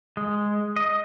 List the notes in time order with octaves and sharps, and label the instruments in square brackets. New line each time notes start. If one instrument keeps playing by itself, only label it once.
[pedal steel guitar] G#3
D#5